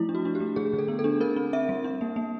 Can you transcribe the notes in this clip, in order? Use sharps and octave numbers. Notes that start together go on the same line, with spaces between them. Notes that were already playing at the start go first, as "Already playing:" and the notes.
Already playing: F3 A3 E4
D4
F#4
D4
G4
A3
D3 G#4
D3
A4
B3
A4
D4
C4 A#4
C4
C4 E5
G3
D4
A#3
A#3